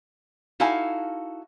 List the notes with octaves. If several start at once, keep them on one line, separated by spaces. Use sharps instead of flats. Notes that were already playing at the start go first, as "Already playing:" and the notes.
D#4 E4 F#4 A4 F5 G#5